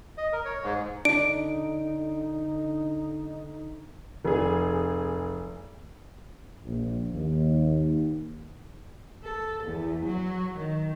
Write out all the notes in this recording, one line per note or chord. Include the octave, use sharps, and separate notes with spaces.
D#5
A#4
C#5
G#2
D3 D4 D#4 D7
F1 G#4
A#1
D#2
A4
E2
F#3
D#3